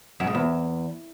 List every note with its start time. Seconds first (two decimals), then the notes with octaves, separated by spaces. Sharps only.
0.20 F#2
0.27 G#2
0.35 E2